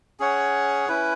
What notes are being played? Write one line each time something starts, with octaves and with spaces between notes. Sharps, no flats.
C#4 G#4 C#5 F#5
C#4 E4 B4